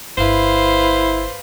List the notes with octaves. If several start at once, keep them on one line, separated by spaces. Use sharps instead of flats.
G1 E4 B4 C5 F5